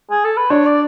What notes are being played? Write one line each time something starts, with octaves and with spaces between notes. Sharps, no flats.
G#4
A4
B4
D4 C#5
D5